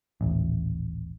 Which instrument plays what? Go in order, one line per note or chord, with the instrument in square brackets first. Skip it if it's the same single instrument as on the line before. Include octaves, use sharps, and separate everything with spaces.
[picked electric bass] D#1 A1